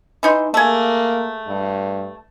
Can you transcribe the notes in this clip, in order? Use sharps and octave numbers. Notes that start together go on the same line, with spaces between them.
E3 D#4 C6
A3 A#3 G#4
G2